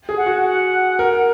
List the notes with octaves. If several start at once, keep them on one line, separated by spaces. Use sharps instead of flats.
G#4
F#5
F#4
F#5
A#4